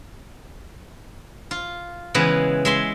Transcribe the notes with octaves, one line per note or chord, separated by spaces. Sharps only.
F4
C#3 E3 G#3 B3 B4
G#3 E5 C6